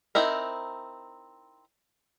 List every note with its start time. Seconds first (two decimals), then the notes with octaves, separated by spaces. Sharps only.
0.15 C4 D#4 E4 A#4